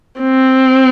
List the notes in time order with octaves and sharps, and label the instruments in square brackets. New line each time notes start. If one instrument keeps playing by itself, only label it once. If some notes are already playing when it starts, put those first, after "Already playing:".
[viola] C4